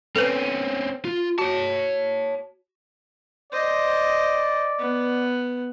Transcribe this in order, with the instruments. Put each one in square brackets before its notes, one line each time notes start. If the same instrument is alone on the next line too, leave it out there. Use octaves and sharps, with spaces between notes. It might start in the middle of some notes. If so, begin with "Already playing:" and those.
[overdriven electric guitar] C4 C#4 [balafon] A4 B4
[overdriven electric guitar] F4
[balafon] F#4 [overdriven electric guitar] C#5 A5
[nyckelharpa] C5 D#5 [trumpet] D5
[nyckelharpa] B3